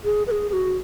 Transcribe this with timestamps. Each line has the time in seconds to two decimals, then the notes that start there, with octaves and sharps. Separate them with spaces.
0.04 G#4
0.27 B4
0.31 G#4
0.50 G#4
0.53 F#4